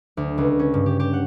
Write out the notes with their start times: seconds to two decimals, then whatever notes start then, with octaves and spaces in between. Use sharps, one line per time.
0.17 D2
0.38 C#2
0.59 C#4
0.74 G2
0.86 G4
1.00 G4
1.13 F#5